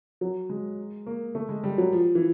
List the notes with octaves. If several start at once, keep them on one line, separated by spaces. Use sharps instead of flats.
F#3
G#3
A#3
A3
G#3
G3
F#3
F3
E3